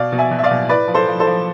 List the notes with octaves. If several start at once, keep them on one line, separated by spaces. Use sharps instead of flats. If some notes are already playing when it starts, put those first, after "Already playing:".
Already playing: B2 D5 F5
B2
E5 G#5
B2
E5
D5 F5
B2
A2 B4 D5
F3
A4 C5
F3
A4 C5
F3